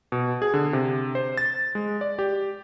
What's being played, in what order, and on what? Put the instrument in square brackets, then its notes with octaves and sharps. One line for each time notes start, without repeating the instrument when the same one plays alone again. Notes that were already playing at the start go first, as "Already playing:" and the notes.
[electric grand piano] B2
G#4
D3
C3
C5
A6
G#3
D5
G4